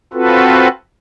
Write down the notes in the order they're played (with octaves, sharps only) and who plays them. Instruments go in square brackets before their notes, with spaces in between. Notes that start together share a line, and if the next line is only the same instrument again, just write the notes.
[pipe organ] C4 F4 F#4 A4 B4